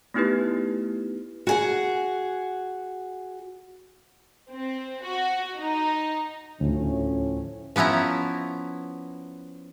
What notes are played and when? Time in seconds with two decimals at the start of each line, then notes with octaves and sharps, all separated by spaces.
0.14 A3 B3 D#4 E4 G4 B4
1.47 F#4 G#4 F#5
4.51 C4
5.04 F#4
5.60 D#4
6.61 D2 A2 F3 C#4
7.76 F3 B3 C#4 E4 A#5